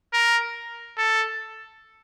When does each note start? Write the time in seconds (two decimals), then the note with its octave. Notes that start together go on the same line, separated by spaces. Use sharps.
0.13 A#4
0.98 A4